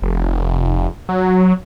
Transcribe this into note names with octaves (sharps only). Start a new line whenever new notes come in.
F1
F#3